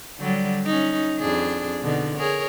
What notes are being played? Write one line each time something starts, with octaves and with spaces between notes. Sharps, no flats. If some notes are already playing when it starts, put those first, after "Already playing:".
D3 F#3 G3
C#4 D#4
F2 D4 G#4
B2 D3 D#4
G#4 A#4 C#5